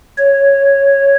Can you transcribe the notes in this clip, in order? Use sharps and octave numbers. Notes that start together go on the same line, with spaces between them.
C#5